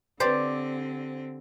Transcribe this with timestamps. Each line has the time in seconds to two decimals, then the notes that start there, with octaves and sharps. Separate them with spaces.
0.20 D3 C4 G4 C5 D5